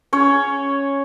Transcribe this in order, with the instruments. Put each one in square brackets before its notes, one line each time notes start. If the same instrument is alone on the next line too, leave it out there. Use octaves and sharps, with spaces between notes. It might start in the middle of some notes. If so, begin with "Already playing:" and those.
[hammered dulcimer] C#4 C#5